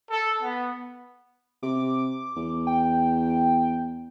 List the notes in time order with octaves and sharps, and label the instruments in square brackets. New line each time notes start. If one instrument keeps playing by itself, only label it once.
[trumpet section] A4
B3
[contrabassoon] C3 [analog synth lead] D6
[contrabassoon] E2
[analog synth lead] G5